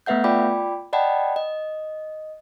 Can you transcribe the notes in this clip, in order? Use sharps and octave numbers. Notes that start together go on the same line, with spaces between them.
A3 B3 B4 E5 F#5 G6
F4 D5 G5 B5 D6
D5 D#5 F#5 G5 A5 B5
D#5